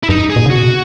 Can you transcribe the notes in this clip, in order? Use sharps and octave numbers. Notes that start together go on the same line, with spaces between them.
E4
F#2 D#4
G#4
A#2
C#3
B2 F#4